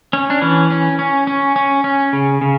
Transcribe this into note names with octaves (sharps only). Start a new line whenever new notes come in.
C#4
D4
E3 C#4
C#4
C#4
C#4
C#4
C#4
C#3
C#3